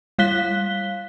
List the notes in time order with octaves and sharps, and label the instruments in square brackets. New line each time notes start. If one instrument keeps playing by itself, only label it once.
[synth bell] G3 F5 F#6 B6 G7